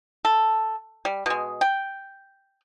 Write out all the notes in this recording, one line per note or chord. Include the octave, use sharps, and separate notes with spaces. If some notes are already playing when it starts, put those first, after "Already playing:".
A4
G3
B2 G#3
G5